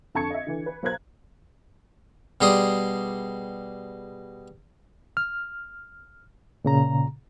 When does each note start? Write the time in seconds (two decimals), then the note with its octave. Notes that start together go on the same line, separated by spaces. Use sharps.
0.14 F2 D3 A5 C#6 G#6 C#7
0.30 D#5 E5
0.47 D3 E3
0.66 B4
0.83 B1 A#4 C5 A#5 F#6 G#6
2.41 B2 G3 G#4 D5 C6 D#6
5.17 F6
6.65 A#2 C#3 A#5